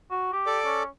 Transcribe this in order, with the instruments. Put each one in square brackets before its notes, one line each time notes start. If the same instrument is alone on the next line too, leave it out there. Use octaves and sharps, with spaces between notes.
[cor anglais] F#4
G4
[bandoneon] A4 D5 D6
[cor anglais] C#4